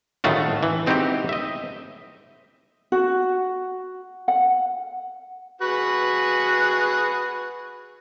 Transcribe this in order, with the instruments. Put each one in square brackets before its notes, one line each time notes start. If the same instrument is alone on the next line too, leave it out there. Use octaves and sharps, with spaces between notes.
[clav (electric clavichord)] A2 D#3 G#3 A3 F4 F#4
E3
G#3 C4 D#4 E4 F#4 G4
D#5 E5
[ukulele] F#4
F#5
[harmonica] F#4 G#4 B4